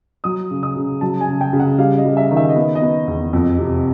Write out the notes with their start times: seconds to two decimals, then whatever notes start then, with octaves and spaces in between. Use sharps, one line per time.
0.24 F#3 D#6
0.51 C#3
0.63 D#6
0.76 C#3
1.01 F#3 A5
1.21 G#5
1.28 C#3
1.41 G5
1.53 C#3
1.59 F#5
1.78 G3 F5
1.97 D#5
2.05 G3
2.17 E5
2.31 D#3
2.37 E5
2.49 D#5
2.56 B3
2.75 D#5
2.82 B3
3.07 E2
3.33 F2
3.58 C3